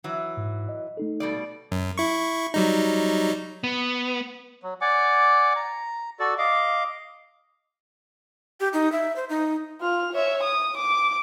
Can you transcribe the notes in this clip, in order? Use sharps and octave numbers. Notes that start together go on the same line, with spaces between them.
E3 F#3
G#2
D#5
A3 D#4 A4
B2 G3 D5
F#2
E4 C#6
F#3 G3 D#4
B3
F#3
D5 F#5 G#5 D6
A#5
F#4 A4 D5
D#5 F5 D6
G4
D#4
E5
C5
D#4
F4 F6
C#5 E5
D#6
D6